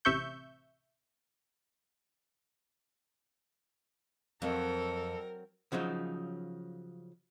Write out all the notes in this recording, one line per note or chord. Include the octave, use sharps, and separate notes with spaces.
A1 C3 E5 C#6 G6
F2 F#3 C4 A4 A#4 C#5
C#3 F3 F#3 D#4